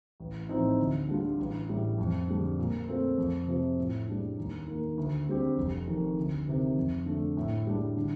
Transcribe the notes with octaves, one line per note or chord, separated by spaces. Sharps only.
A1
A2 F3 C4 D#4
D2
D3 G3 D4 F4
A1
A2 G3
F2
D3 G3 D4
A#2
A3 C4 F4 A4
F2
C3 F3
A2
G3 D4
D#2
D#3 A#3
D2
D3 G3 C4 G4
F1
F2 D#3
D2
C3 D#3
F2
D3 A3 D4
A2
G3 D4
D3